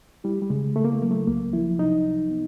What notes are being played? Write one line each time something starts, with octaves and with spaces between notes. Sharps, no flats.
G3 E4
G3
C#3 G#3
C#3 A3
A#3
A3
F#3 A#3
A3
C2 A#3
F3 E4
C3 D#4
C3
B3